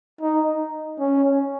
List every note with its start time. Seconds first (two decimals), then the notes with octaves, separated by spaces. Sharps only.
0.21 D#4
0.99 C#4